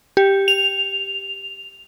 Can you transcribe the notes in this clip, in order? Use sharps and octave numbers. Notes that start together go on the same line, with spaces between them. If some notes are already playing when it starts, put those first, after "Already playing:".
G4
F7